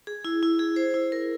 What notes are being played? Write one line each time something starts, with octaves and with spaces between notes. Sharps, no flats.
G#4
E4
E4
G#4
C5
E4
A#4